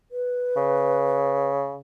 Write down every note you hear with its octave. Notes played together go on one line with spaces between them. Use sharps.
B4
C#3